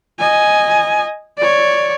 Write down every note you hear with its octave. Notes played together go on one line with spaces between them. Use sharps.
D#5 G#5
C#5 D5